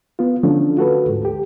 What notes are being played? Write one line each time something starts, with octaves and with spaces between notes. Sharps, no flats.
B3 F4
D3 F3 A3 C#4 D4
F4 F#4 A4 B4
D2 G#2
G4